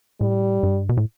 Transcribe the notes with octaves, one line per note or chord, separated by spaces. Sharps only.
A2 G3
G2
B2
A2